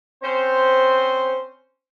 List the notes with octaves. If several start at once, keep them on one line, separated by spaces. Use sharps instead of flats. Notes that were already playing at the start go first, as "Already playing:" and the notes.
C4 C#4 C5